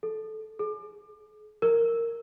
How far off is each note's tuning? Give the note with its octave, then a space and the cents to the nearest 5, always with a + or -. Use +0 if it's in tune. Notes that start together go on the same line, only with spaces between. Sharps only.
A4 -15
G#4 +40
A#4 -15